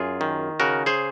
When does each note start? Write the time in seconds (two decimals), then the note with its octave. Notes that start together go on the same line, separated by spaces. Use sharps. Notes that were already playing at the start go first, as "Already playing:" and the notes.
Already playing: F#2 F4 G#4
0.21 D#3
0.60 C#3 F#4 A#4
0.86 G#4 C5